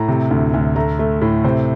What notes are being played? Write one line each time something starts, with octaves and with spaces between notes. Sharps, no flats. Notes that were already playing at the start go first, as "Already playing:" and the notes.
Already playing: A2 A#5
C3
D2
D2
A3 A#5
A3
A2
C3 C5